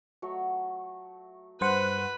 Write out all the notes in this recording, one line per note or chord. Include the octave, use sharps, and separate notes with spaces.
F#3 A3
G2 B4 C5 F#5